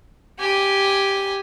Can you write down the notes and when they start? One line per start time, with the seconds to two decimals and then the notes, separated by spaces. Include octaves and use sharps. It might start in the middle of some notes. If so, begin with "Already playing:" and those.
0.39 G4 G#5